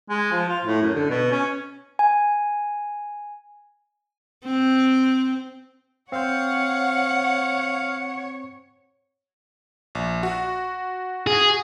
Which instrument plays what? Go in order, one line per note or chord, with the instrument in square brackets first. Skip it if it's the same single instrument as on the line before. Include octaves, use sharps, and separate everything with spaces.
[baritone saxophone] G#3
F3
F4
A2
F#2
D3
B2
C#4
[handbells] G#5
[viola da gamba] C4
[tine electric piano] C4 C5 [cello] C#5 [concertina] F5 [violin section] F#5
[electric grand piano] A#1
F#4
[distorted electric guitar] G#4